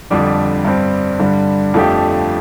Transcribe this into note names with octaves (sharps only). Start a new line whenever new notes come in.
F2 D3 G3 D4
G2 G3 C4
G2 D3 G3
F2 F3 A3 D4 G4